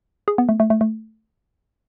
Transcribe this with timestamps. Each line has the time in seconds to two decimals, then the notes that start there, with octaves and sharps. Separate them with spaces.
0.28 G#4
0.38 B3
0.49 A3
0.60 A3
0.70 A3
0.81 A3